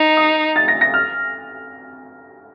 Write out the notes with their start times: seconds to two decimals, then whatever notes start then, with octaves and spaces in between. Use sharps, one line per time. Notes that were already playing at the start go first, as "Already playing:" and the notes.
Already playing: D#4
0.17 D#6
0.56 A6
0.68 A#6
0.81 A#6
0.94 F6